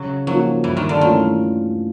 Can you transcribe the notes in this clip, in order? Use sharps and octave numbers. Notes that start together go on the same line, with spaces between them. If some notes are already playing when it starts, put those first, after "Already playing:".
Already playing: C#3 F#3
F3 F#3 A#3 D#4 F#4
G2 E3
D#3
D3
D#3 E3 A3 C#4 F4